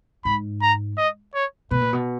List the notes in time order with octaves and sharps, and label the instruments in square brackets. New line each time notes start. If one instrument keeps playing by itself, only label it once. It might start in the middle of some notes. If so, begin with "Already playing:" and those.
[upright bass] G#2 [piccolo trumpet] B5
[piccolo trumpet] A#5
D#5
C#5
[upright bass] B2 [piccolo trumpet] B4
[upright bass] A#2
B2